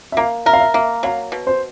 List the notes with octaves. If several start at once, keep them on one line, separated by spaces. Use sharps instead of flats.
E5
A#3 F5
A#4 E5
F5
E5
A#3 E5
F#3 F5
B2
C5